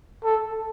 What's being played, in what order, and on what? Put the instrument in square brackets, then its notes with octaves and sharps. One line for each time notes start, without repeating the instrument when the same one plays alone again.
[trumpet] A4